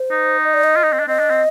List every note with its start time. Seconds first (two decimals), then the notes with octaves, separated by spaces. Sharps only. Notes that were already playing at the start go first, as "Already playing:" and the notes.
Already playing: C5
0.11 D#4
0.44 D#5
0.54 D5
0.64 D#5
0.76 F4
0.83 D#4
0.92 C4
1.00 D4
1.08 C4 D#5
1.19 D4
1.30 C4